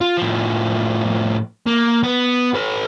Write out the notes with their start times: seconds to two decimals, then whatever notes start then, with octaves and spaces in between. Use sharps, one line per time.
0.01 F4
0.17 A2 F3
1.67 A#3
2.03 B3
2.54 A4 B4